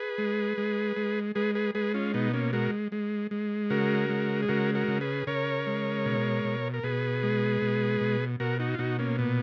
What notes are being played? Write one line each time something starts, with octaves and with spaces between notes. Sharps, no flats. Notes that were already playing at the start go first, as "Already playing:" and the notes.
Already playing: G#4 B4
G#3
G#3
G#3
G#3 G#4 B4
G#4 B4
G#3 G#4 B4
C#4 F4
B2 B3 D#4
A#3 C#4
G#3 F#4 A#4
G#3
G#3
C#3 F#4 A#4
G#3
G#4
C#3 F#4 A#4
F#4 A#4
C#3
G#4 B4
C#3 A#4 C#5
G#3
B2
B2
A#4
B2 G#4 B4
G#3
B2
B2
B2 F#4 A#4
D#4 F#4
F4
B2 D#4 F#4
A#3 C#4
A#2 B3